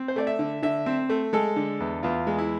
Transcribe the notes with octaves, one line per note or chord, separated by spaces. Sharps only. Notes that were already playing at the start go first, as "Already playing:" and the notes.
Already playing: C4
C5
A3 D5
E5
D3
D3 E5
C4
A3
G#3 A4
D3
E2
E2 F4
G#3
E4